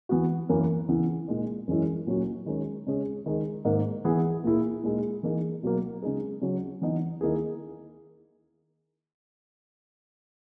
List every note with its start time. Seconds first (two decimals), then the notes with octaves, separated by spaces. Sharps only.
0.09 E3 B3 F#4
0.49 F#2 E3 A#3
0.89 C#3 E3 B3 E4
1.28 A#2 G#3 D#4
1.67 F#2 E3 G#3 C#4 E4
2.07 A#2 F#3 C#4 F#4
2.46 D#3 G#3 C#4
2.87 C#3 G#3 C#4 G#4
3.26 D#3 G#3 D#4 G#4
3.65 G#2 D#3 A#3 D#4
4.04 E3 B3 E4 G#4
4.44 A#2 A#3 E4 G#4
4.84 A#2 G#3 D#4 G#4
5.23 E3 A#3 D#4 G#4
5.63 B2 F#3 A#3
6.02 C#3 G#3 D#4 G#4
6.42 C#3 F#3 C#4
6.82 E3 B3 D#4
7.21 D#3 A#3 E4 G#4